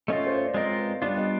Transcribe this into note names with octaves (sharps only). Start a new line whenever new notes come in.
A3 C#4 F4 D#5
C5
C#5
D5
G#3 C4 F4 A#4 D#5
B4
G3 B3 D4 F4 D5
D#5